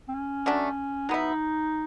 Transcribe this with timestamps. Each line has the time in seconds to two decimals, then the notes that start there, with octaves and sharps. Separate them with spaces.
0.08 C4
0.14 C#4
0.46 F#3 A3 D4
1.09 F#3 B3 D#4 E4